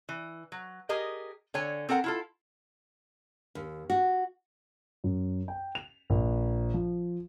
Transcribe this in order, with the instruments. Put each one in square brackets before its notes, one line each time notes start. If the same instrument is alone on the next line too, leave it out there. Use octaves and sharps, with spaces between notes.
[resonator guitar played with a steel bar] E3
F#3
G4 G#4 A#4 D#5
D3 C#5 G#5
C4 A4 A#4 F#5
E4 F4 A4
[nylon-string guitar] D#2
F#4
[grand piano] F#2
G5
F7
A#1
F3